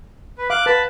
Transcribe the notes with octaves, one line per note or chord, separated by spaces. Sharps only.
B4
F5 D6 F#6
B4 A5 B5